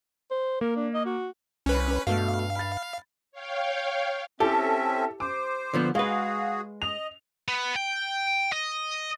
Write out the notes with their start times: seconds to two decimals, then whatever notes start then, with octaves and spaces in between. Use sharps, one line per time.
0.31 C5
0.61 A#3 A#4
0.76 D4
0.94 D#5
1.06 F#4
1.66 C2 C#4 B4
2.07 G2 B2 A3 F5
2.56 B5 A6
3.32 C#5 F5 G5
4.40 C4 C#4 E4 G4 A4 E5
5.20 C5 D6
5.73 D3 F3 B3
5.95 G#3 F#4 G#4 B4 F5
6.82 D#5 F7
7.48 B3
7.76 G5
8.53 D#5